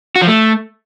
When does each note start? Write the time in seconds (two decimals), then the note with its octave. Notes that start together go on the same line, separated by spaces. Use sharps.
0.16 F#4
0.22 F3
0.27 A3